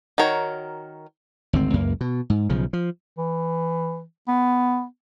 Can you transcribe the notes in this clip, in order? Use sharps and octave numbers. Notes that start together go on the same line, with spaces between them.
D#3 F#4 A#4 C#5
G#1 D2 C4
C#2 F#2 A#3
B2
G#2
B1 C#3 F3
F3
E3
B3